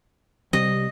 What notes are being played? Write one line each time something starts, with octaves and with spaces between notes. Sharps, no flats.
C3 G3 C4 D#5